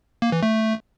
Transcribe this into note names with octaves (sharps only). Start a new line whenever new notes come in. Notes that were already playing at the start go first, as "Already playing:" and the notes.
A#3
E3
A3